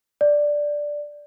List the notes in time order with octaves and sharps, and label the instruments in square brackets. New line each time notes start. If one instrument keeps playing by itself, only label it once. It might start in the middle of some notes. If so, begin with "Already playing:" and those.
[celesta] D5